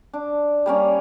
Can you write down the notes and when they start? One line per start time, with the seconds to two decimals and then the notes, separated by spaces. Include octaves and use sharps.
0.14 D4
0.66 G3 A#3 C#4